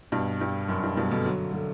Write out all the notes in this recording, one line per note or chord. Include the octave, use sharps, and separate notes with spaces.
G2 B2
G2
F#2
G2
G2 B2
B2 D3
D3 F#3
D3 F#3